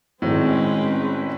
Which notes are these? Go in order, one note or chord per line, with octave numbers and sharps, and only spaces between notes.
G#1 A2 G#3 C4 C#4 B4